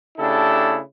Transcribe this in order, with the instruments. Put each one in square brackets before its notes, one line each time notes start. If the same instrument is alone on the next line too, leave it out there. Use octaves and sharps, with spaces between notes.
[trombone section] C#3 A3 D4 E4 G4 A4